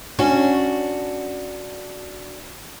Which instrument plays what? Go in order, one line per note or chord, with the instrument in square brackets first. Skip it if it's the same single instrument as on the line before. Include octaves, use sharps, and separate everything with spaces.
[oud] C#4 [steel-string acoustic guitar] D4 F#4